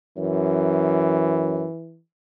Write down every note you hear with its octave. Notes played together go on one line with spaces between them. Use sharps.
F#2 E3